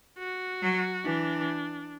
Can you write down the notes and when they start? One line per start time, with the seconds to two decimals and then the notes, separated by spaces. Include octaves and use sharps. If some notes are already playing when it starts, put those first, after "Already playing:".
0.18 F#4
0.62 F#3
1.05 E3 D4